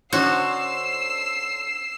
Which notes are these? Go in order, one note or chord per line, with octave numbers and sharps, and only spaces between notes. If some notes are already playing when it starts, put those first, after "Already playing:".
D3 C#4 F#4 C5 E6 C7